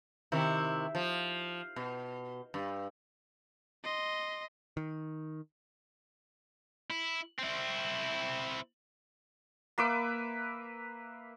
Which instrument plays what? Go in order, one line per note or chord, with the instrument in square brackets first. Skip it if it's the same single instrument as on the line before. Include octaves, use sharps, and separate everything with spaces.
[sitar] C3 D#3 E4
F3
B2
G2
[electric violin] D#5 C6
[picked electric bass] D#3
[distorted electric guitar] E4
C4 E4
[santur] A#3 B4 E5 D6